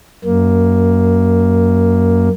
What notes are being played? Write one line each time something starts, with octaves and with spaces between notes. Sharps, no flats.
F#2 A#3